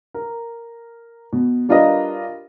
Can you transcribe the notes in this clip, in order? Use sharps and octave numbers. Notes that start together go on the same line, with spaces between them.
A#4
B2
G3 D4 F4 A#4 B4 D#5